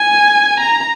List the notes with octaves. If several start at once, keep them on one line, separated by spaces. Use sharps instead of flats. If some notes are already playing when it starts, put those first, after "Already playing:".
Already playing: G#5
A#5